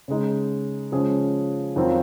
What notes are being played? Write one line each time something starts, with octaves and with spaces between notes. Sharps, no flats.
C#3 G#3 D#4
C#3 F3 G#3 C#4 G#4
F2 D#3 F#3 C4 F4